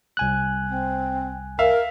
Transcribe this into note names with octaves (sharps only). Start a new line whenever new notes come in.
C2 G#5 F#6
C4
A#4 E5 F5